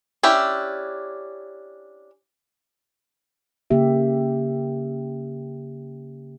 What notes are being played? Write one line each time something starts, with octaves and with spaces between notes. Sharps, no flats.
C#4 D4 E4 G4
C#3 A#3 G4 E5